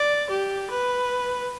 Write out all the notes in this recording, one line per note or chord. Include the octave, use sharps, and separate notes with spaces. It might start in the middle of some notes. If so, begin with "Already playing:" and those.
Already playing: D5
G4
B4